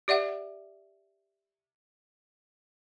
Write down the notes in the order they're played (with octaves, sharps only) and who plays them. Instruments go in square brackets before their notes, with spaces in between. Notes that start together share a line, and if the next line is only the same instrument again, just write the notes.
[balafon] G4 D5 E5 F#5